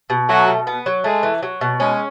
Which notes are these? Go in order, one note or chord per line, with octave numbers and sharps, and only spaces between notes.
B2
F#3 A3 F#4
B2
B3
F#3
G#3 A3 G#4
E3
F#3
B2
G#3 C#4